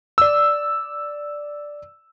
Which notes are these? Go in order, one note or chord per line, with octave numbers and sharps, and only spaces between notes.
D5 E6